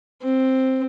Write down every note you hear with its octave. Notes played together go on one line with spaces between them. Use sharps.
C4